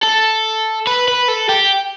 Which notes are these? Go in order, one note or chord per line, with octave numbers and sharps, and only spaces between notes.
A4
B4
B4
A4
G4